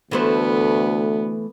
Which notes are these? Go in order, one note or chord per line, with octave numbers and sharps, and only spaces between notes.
D2 E3 A3 B3 C5